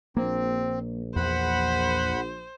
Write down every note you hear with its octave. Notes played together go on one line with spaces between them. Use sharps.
A#1 A#3 C4
E2 C5 F#5 B5